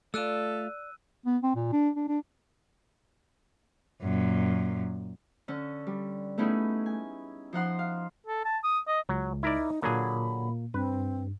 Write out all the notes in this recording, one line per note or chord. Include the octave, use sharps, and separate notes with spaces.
A3 F4 A4 D5 E6 F#6 D#7
B3
C4
A#2
D4
D4
D4
F#2 A#2
D3 C#4
G3
A3 B3 C#4 D#4 E4 G#4
G#5
F3 D#4 F#5 C6
F5
A4
A5
D#6
D#5
C#2 F#3
D#4 E4 A#4 D5
A#2 D3 F#3 A#3 G#4 B5
G2 C4 B4